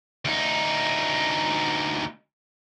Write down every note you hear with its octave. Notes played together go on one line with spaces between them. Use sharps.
D2 D#4